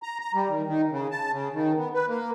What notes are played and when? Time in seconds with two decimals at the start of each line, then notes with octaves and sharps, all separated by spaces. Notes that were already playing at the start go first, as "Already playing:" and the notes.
0.03 A#5
0.21 A#5
0.34 G3
0.49 D#3
0.67 D#3
0.91 C#3
1.11 A5
1.31 C#3
1.54 D#3
1.78 B3
1.94 B4
2.08 A#3